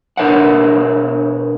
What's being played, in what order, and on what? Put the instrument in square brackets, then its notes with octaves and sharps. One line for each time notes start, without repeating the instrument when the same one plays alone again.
[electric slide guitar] B2 D4 A#4 C#5 E5 F#5